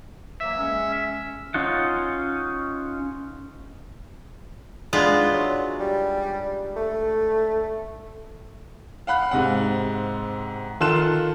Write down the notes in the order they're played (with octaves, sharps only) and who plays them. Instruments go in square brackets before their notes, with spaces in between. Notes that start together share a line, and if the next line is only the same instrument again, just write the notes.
[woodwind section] E3 F#3 A#3 [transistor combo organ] E5
[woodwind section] G#3 C#4
[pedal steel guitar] C#4 D#4 F4 F#5
[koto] G#3 B3 F4 [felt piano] D4 D#4 D5
[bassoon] F#3
G3
A3
[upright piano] F5 F#5 B5 F#6
G#2 C3 F#5
D#3 F4 A4 C6 F#6 E7